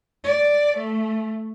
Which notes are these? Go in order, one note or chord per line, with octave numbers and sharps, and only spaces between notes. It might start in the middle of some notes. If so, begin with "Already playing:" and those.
D5
A3